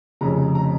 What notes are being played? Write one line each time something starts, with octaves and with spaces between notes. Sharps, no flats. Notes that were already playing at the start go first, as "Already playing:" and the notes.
F1 F2 C#3 A#5
A#5